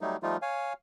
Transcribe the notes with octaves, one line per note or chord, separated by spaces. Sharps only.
F#3 G3 A3 D#4
F3 G3 A3 D#4 F4
C#5 F5 G#5